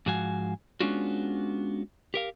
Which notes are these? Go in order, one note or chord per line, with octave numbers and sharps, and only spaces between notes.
G#2 F3 F#4 F5 G#5
G#3 B3 C#4 D4 F4 F#4
G4 A#4 F5